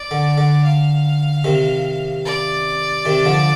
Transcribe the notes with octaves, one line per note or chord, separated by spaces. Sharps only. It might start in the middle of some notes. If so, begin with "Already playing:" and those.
Already playing: D5
D3
D3
F5
C3 D#3
D5
C3 D#3
D3 F3